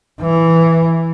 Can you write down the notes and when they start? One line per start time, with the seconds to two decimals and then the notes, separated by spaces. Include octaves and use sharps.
0.21 E3